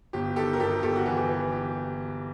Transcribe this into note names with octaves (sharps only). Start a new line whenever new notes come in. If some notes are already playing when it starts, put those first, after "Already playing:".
G1 G4
D#3 G4 A4
A#4
G1 G4 A4
G1 G4 A4
F#4
E3 G4
E3
G4